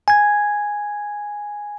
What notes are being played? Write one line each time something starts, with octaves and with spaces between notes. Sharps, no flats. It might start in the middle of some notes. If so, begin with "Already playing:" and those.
G#5 G#6